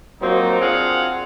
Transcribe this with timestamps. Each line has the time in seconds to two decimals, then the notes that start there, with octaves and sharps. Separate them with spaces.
0.21 F3 F#3 A#3 C4 D#4
0.61 C4 D4 F4 G#4 F5 F#5